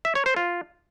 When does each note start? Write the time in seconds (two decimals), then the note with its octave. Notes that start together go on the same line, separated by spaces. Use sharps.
0.05 E5
0.15 C#5
0.26 C5
0.36 F4